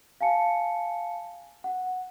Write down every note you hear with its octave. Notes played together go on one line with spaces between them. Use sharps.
F5 G#5 A5 C#7
F#5